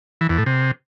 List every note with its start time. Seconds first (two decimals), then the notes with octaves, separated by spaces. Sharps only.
0.21 E3
0.29 E2
0.38 A2
0.46 C3